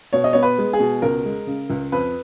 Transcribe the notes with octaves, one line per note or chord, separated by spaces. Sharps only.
B2 C#5
D#5
B3 C#5
B4
G#3
G#4
B2
C#2 A#4
G#3
C#3
C#2
F2 B4